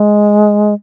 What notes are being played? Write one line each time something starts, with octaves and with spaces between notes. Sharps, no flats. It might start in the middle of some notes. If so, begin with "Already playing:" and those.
Already playing: G#3